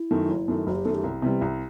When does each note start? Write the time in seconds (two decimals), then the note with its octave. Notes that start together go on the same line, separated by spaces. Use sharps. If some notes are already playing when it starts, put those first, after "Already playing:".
Already playing: E4
0.11 F#2 D#3 A3
0.29 F#1
0.48 F#2 D#3 A3
0.67 F#1 F#4
0.75 G4
0.85 F#2 D#3 A3 A4
0.95 G4
1.04 C2
1.22 C3 E3 G3
1.41 C2